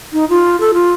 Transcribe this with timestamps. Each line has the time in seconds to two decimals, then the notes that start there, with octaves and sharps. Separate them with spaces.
0.13 D#4
0.29 F4
0.60 A4
0.74 F4